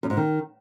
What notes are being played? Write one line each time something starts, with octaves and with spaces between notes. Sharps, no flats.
F#2
G#2
D#3